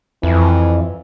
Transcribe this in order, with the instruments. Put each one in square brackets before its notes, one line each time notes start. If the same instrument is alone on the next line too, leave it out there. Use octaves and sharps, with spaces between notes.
[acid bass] F2 [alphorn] E3